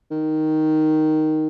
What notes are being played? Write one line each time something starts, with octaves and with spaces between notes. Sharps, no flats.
D#3